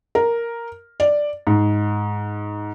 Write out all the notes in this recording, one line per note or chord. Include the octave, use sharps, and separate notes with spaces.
A#4
D5
G#2